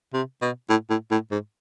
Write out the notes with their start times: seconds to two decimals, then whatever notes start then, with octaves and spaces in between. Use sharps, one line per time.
0.14 C3
0.42 B2
0.70 A2
0.90 A2
1.11 A2
1.31 G#2